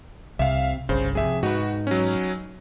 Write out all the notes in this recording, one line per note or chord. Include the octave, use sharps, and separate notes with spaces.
C2 C3 E5 F5
G1 C2 C#3 C5
F2 A2 C3 G#4 E5
G#2 D#4 F#4 B4
F#3 C#4